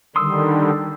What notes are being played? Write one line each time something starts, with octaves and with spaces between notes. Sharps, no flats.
D3 D#3 G3 C6 D#6 E6